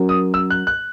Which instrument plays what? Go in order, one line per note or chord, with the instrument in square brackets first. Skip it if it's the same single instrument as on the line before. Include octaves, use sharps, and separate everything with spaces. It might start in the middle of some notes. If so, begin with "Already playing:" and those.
Already playing: [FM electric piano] F#3 C#4 F#4 A#4
[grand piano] D#6
E6
F#6
F#6